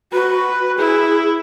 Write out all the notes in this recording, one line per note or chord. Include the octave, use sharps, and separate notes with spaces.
F#4 B4
E4 G#4